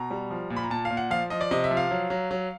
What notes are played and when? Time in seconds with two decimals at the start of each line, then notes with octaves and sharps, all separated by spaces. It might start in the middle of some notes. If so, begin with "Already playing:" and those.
Already playing: B2 A#5
0.11 G3
0.31 F3
0.50 A#2
0.56 B5
0.64 A#5
0.70 A#2 A5
0.85 F5
0.90 A#2
0.97 F#5
1.10 F3 F5
1.30 F3 D#5
1.41 D5
1.51 C3 D#5
1.64 E5
1.71 F3
1.77 F5
1.91 F#3
2.10 F#3
2.31 F#3